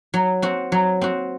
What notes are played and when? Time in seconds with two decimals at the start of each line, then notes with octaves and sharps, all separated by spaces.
0.14 F#3
0.42 C4 F#4
0.72 F#3
1.01 C4 F#4